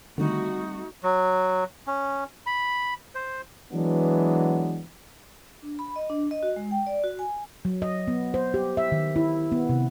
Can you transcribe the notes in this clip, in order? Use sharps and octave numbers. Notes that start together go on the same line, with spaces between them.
D3 D#3 G3 A3 C4 D#4 F#4
F#3
C#4
B5
C5
E3 F#3 G#3 B3 D4
D4
B5
D#5
D4
D#5
F#4
G#3
G5
D5
F#4
G#5
F#3
D#5
B3
C5
G4
E5
D#3
E4
B3
C3